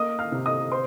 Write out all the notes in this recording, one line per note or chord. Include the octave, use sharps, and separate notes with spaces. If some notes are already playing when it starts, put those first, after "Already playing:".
Already playing: A#3 D#5 D#6
F5 F6
C3
D#5 D#6
C5 C6